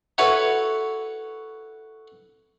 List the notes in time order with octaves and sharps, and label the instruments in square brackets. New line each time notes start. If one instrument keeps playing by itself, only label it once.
[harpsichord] E4 F#4 A4 B4 C#5